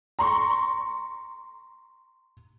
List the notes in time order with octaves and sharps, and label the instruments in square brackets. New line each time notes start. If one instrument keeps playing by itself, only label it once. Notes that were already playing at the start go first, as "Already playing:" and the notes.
[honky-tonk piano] A#5 C6 C#6